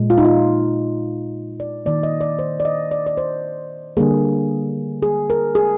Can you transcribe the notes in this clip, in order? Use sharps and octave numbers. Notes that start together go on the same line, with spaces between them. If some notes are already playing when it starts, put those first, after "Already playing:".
Already playing: A#2 G#3
F4
D#4
F4
D5
D#3 A#3 D5
D#5
D5
C5
D5
D#5
D5
D5
C5
D3 G3 A#3 G#4
G#4
A#4
G#4